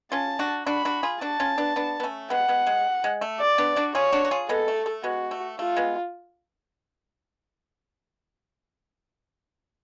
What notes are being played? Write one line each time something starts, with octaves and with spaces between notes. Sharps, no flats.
C#4 F4 A5
D4 F#4
D4 F#4 B5
D4 F#4
F4 G#4
D4 F#4 A5
C#4 F4
B3 D4
B3 D4
B3
A3 C#4
G#3 B3 F#5
G#3 B3
G#3
G#3
A3
D5
B3 D4
D4 F#4
F4 G#4 C#5
D4 F#4
F#4
F4 G#4
G#3 B3 A4
A3
A3
G#3 B3 F#4
A3
A3 F4
G#3 B3